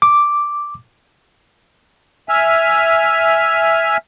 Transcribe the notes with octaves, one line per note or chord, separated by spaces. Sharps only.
D6
E5 G#5 F6